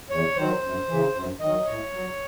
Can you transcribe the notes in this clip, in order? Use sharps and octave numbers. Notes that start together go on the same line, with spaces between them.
E2 C#5
D#3 F#3 C5
F#2
C#3 E3
F#2
D#3 F#3 D#5
A2 C#5
F#3